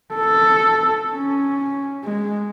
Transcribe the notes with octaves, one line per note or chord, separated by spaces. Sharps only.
A4
C#4
G#3